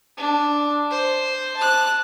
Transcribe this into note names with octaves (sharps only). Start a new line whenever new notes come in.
D4
C5
A5 F#6